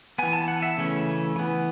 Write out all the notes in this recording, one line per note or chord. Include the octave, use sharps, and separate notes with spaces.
E3 B3 G#5
A5
F#5
E5
C#3 E3 A3 C#4
E3 B3